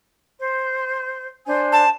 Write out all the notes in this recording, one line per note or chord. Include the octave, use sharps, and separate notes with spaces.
C5
D4 C5 G#5
A5